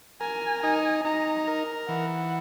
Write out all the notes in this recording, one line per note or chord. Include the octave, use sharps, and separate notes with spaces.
A#4 G#5
D#4 G#5
D#4 A#5
A#4
E3 F#5